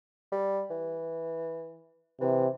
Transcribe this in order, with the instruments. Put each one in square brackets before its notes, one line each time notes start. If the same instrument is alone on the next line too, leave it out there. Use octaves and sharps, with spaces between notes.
[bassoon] G3
E3
[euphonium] C3 [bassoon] E3